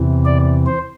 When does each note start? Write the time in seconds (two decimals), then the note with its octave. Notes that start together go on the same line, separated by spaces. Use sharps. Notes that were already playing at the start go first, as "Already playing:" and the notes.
Already playing: E2 C3 E3
0.25 D5
0.66 C5